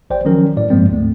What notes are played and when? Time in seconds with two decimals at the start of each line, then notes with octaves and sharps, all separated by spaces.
0.10 A1 C5 D5 G5
0.25 D#3 F3 F#3 C#4 A#4
0.57 A2 D5
0.70 G2 F3 G#3 A#3 C4
0.90 D2 G#2 A3